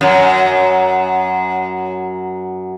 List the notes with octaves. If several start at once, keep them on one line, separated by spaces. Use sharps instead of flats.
F#2 F#3